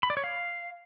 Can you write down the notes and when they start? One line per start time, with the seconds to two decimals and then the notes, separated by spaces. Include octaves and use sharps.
0.03 B5
0.10 D5
0.17 C#5
0.24 F5